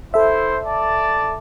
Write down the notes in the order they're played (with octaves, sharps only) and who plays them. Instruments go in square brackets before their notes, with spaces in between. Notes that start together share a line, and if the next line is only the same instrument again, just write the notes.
[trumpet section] E4 C5 [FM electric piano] A4 E5
[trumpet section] D5 A5